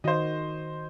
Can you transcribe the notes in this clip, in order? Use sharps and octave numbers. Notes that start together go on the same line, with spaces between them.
D#3 F#4 C5 D#5